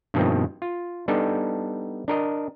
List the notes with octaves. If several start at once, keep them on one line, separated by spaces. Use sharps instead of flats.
G2 B2 D#3 F3 A#3 C4
F4
G3 B3 D4 D#4 A4
D4 A#4 D#5